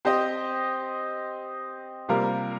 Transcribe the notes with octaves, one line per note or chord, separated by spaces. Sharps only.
C4 G4 C5 D#5
C3 G3 A#3 F4 A#4